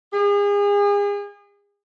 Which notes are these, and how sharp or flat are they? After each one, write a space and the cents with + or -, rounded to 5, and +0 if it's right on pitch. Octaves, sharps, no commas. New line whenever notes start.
G#4 -35